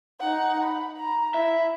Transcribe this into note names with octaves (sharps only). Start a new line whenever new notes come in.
D#4 F#5
B5
A#5
E4 E5